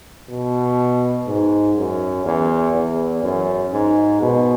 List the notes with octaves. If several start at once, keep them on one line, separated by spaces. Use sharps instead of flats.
B2
G#2
F#2
E2
E2
F#2
G#2
B2